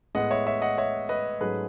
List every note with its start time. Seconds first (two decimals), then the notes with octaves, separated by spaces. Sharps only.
0.15 A2 G#3 B3 D#5 F#5
0.31 C#5 E5
0.47 C#5 E5
0.62 D#5 F#5
0.78 C#5 E5
1.09 B4 D#5
1.41 G#2 F#3 A3 C#4 G#4 B4